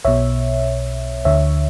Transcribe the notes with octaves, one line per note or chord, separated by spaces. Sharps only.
B1 B2 C#5 E5
D2 D3 C#5 E5